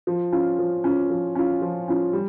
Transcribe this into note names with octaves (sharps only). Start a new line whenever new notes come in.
F3
C#4 F4
F3
C#4 F4
F3
C#4 F4
F3
C#4 F4
G3